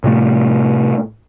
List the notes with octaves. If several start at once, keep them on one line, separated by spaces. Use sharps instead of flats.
A2 C3 A3